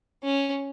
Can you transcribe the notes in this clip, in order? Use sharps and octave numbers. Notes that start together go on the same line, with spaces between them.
C#4